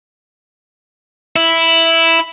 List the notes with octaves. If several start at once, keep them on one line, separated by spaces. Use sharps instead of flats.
E4